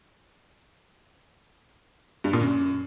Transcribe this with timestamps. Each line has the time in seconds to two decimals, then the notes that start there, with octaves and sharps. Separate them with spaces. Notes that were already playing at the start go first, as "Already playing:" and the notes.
2.24 G2
2.33 A#2
2.42 F#2